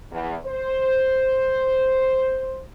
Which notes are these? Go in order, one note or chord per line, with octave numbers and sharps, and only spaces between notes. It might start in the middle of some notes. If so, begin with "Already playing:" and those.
E2
C5